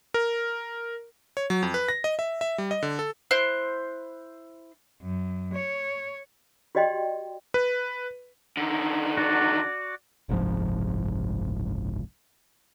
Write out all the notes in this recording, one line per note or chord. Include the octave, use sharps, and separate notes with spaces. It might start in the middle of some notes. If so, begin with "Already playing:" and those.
A#4
C#5
F#3
F2
B4
A#6
D#5
E5
E5
G3
D#5
D3
A4
E4 C5 F#6
F#2
C#5
F#4 G4 D5 D#5 G5 C6
B4
D3 D#3
F#4 D5
F#1 C2 G#2 F3